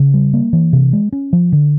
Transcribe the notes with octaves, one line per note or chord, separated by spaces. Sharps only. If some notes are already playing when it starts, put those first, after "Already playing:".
Already playing: C#3
G3
A#3
E3
C3
G#3
C#4
F3
D3